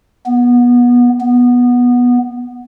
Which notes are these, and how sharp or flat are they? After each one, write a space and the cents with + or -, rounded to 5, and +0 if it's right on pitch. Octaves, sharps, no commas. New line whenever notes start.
B3 -20
B3 -10